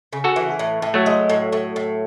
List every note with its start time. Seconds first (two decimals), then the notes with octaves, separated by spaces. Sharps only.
0.13 C#3
0.24 F#4 A4
0.36 E3
0.59 A2
0.82 A2
0.94 F#3 A3
1.06 G#3
1.30 A2
1.52 A2
1.76 A2